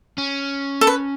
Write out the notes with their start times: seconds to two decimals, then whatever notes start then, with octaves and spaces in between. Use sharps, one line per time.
0.18 C#4
0.81 A4
0.87 B4